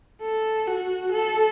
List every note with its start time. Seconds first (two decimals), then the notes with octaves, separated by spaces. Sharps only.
0.22 A4
0.67 F#4
1.12 A4